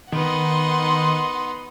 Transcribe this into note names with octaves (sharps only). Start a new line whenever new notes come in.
D#3 B3 D#4 F#5 C6